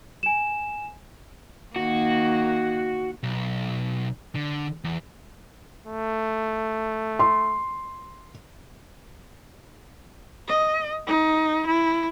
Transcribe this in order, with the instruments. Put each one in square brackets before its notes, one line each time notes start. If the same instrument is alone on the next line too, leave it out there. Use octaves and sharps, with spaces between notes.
[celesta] G#5 E7
[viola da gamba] D#3 A#3 [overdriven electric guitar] F#4
[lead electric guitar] B1
D3
E2
[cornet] A3
[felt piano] C6
[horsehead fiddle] D#5
D#4
E4